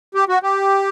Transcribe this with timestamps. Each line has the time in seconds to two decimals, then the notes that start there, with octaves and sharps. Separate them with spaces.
0.15 G4
0.29 F#4
0.43 G4